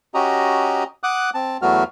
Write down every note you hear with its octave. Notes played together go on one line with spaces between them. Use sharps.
C#4 F#4 G4 D#5 A#5
F#5 D6 D#6 F#6
C4 A5
E2 F#3 A3 B3 F#4 F6